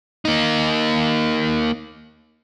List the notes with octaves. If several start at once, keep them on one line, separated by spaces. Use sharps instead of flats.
A#3 D#4